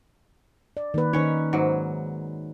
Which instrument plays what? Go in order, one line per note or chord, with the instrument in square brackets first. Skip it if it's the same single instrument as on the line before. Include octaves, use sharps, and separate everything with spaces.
[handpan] D5
D#3 A#3 B4
[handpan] D#3 D#4 [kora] C#4 C#5
[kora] G#2 F#3